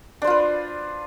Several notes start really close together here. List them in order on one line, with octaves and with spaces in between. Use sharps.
D4 C5 F4 B4